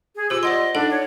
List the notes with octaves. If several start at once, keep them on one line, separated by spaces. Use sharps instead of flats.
G#4
F4 G4 C5 E6
D5 D#5 F#5 C6
D4 D#4 A4 F#5
C#5